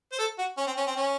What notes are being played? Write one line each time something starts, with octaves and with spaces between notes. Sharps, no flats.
C5
A4
F#4
C#4
C4
C#4
C4
C#4